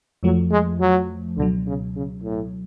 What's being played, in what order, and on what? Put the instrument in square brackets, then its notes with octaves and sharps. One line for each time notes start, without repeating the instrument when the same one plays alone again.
[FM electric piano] F2 F3 A3 [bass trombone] F#3
[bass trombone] G#3
F#3
[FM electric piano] C#2 B2 F#3 [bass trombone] D3
[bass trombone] C#3
C#3
A2